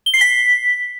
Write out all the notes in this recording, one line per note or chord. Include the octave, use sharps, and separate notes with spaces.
G7
C7
B6